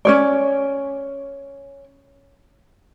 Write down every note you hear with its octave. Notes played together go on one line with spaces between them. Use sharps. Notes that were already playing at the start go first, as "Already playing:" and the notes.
C#4 C#5 D5